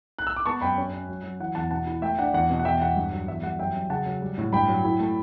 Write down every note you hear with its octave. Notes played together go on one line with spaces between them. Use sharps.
F#6
E6
D6
B3 A5 C#6
F#2 G5 B5
C#4
C#4
F#3
F#3
E3 F#5
E2 F#5 A5
B2 F#5 A5
E4
A3 E5 G5
D4 F#5
E2 F#5
B2
F#5
E2 E5 G5
E2 F#5
G2
F#3
E2 E5
G3 F#5
F#2 E5 G5
F#2
C#3 F#5 A5
F#3
G3
A2
G2 G5 B5
F#3
E4
A3